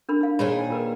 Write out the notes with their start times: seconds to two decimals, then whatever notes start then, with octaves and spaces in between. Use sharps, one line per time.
0.09 D4 A#4 B5
0.21 D#4 F5
0.39 A#2 D#3 G#4 C5 C#5 B5
0.70 F4 A#4 B4